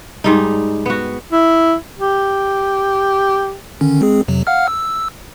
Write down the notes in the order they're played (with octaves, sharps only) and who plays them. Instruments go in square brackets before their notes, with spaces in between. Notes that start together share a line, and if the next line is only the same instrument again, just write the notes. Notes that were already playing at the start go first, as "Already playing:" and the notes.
[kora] G#2 G3 D#4
B3 F#4
[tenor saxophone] E4
G4
[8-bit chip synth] D3 D#3 C#4
G#3 C4 G#4
F2 C3 F#3
F5 F#5 F6
E6